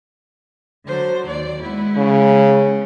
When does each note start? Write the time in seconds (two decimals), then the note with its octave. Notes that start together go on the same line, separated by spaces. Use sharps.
0.87 D3 F#3 C5
1.27 D#2 D5
1.62 G#3 B3 E4
1.97 C#3